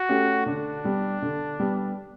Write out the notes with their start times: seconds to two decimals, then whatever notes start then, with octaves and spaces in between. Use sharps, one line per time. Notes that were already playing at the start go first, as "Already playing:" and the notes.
Already playing: F#4
0.09 A3 C#4 G4
0.46 D3 D4
0.84 G3 B3
1.22 D3
1.60 G3 B3